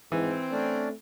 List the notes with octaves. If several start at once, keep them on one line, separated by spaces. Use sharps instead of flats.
G#2 E3 C4
A3 C#4 D4 D5